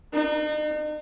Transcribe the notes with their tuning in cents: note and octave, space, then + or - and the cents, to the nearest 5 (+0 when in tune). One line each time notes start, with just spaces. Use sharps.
D#4 -45